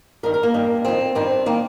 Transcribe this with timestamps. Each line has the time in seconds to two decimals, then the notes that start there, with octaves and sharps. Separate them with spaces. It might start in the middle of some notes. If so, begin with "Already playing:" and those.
0.23 G2 D#3 A#4
0.34 A#4
0.43 A#3
0.54 G2 D#3
0.85 F2 D#3 C4
1.15 G2 D#3 C4
1.46 D#3 A#3